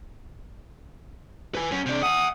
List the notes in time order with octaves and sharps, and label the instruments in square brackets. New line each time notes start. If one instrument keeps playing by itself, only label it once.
[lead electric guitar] B4 G#5
F#2 C#4
C3 D4
[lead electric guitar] E5 F#5 [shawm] D#6